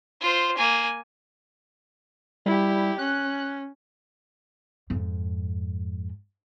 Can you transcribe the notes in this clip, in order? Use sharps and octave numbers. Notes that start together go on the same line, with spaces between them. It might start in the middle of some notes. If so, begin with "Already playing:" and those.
F4 C5
A#3 G#5
G3 E4 G4
C#4 F#6
F2 G#2